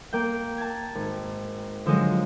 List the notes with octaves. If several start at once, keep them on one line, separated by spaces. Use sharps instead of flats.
A#3 G5
A5 G#6
G#1
D3 F3 F#3 G#3